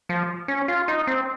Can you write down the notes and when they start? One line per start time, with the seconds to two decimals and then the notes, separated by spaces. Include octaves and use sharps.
0.09 F3
0.48 C#4
0.68 F4
0.88 D#4
1.07 C4